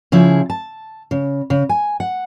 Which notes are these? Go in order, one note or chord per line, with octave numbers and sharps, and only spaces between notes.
C#3 F3 E4 G#4
A5
C#3
C#3
G#5
F#5